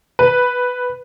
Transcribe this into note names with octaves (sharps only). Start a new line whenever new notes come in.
B4